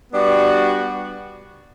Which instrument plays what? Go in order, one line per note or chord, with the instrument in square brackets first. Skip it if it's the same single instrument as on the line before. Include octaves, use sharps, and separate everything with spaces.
[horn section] G3 B3 D4 F#4